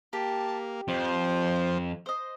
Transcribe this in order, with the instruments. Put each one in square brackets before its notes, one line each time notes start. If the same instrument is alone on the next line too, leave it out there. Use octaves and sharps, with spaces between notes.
[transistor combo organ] A#3 [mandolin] G4 [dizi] A5
[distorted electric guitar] F2 [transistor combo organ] F3 [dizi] C5
[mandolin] C5 D#5